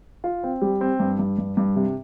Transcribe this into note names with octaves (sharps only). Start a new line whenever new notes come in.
F4
C4
G3
C4
G2
G2
G2
G2
C3